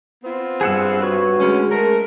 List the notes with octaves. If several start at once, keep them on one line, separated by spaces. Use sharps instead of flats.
B3 C4 F4
G2 G#4 F#5 E6
F#4 B4 C#5
D2 G#3 C#4
A3 A#4